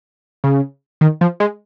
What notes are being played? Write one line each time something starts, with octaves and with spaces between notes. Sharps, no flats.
C#3
D#3
F3
G#3